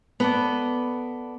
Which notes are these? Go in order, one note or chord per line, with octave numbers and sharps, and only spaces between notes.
B3 A4 D5